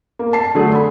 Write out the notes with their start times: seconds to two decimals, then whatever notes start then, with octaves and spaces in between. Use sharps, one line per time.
0.19 A#3
0.33 A5 C7
0.55 D3 F#3 A3 D4 G#4
0.71 B5 C6